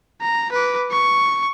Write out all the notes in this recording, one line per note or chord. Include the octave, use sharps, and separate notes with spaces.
A#5
B4 D6
C#6